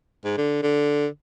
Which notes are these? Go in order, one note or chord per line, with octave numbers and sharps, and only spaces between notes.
G#2
D3
D3